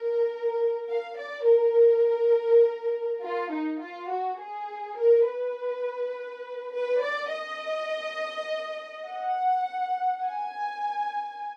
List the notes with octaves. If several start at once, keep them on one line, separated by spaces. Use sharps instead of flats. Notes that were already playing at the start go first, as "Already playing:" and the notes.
Already playing: A#4
F5
D5
A#4
F4
D#4
F4
F#4
G#4
A#4
B4
B4
D5
D#5
F#5
G#5